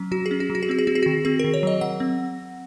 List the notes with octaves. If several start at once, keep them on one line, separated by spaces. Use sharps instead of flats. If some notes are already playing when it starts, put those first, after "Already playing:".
Already playing: F#3 C#4
F#3 F#4
G#4
C#4
F#4
F#3
F#4
G#4
C4 F#4
G#4
C4 F#4
G#4
F#4
D#3
C4 G#4
A#4
D#3
C#5
F#3 D#5
F#3 F#5
C4